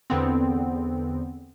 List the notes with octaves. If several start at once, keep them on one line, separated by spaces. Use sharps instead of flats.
E2 D3 B3 C4